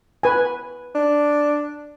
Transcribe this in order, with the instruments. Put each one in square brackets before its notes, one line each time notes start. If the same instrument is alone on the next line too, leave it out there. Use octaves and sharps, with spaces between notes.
[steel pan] B4 G#5
[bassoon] D4